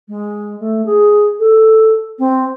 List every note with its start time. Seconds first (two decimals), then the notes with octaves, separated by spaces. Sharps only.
0.08 G#3
0.59 A3
0.85 G#4
1.39 A4
2.18 C4